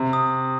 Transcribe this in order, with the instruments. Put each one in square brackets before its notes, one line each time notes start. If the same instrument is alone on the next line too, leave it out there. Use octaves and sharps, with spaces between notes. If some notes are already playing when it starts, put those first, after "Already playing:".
Already playing: [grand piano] C3
[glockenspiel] D#6